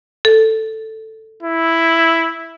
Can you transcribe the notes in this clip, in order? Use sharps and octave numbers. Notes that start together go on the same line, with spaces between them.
A4
E4